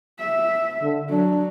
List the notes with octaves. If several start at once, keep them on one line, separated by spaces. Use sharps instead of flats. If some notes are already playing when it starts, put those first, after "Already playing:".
E5
D3
F#3 D4